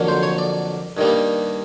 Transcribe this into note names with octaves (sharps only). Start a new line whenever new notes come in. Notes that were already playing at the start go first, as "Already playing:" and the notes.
Already playing: F2 D3 F#3 A#3
C5
C#5
D5
G2 D#3 G3 A#3